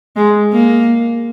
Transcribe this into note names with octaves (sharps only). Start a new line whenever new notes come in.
G#3
A#3